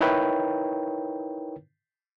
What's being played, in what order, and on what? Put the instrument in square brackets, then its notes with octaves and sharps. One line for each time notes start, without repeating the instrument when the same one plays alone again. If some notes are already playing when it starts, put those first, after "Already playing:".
[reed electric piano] D#4 E4 A#4 B4 C#5 G5